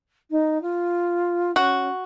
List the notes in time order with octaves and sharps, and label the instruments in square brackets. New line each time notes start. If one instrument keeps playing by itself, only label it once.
[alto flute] D#4
F4
[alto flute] C#4 [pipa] F#4